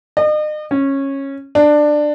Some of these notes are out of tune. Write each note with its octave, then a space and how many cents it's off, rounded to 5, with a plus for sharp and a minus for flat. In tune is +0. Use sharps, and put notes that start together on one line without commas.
D#5 -40
C#4 -15
D4 +15